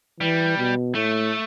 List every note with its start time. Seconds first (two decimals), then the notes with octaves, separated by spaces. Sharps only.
0.20 E3 G3
0.58 B2
0.95 A2 A3